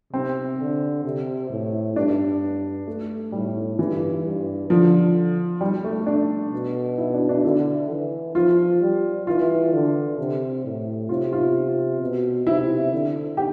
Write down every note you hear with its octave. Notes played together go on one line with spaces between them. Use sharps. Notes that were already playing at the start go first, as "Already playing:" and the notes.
C3 C4
D3
C3
A2
G2 D4
A3
A2 G3
G2 E3
G2
D3 F3
G3
A3
D4
B2
E4
D4
D4
D3 E4
E3
F3 F4
G3
E3 F4
D3
C3
A2
C3 F4
F4
B2
C3 E4
D3
G4